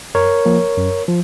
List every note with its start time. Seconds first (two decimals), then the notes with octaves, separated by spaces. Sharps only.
0.15 F#2 A#4 C#5
0.45 F3 A#3
0.77 F#2
1.08 F3